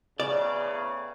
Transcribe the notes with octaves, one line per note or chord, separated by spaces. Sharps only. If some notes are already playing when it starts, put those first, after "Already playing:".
E2 A2 C#3 D5